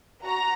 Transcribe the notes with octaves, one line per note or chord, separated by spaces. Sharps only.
F#4 A#5